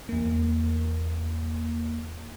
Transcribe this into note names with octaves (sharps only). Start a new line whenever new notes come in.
E2 A#3